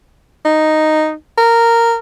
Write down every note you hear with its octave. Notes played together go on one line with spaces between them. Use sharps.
D#4
A#4